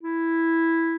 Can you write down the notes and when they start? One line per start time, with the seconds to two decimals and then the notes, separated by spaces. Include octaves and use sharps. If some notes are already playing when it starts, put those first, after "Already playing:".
0.03 E4